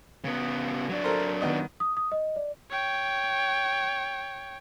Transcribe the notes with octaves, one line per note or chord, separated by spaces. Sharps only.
C#3 B3
F#3 D4
A4 A#4 C5
D#3 B3 D#5
D#6
D#6
D#5
D5
C#5 G5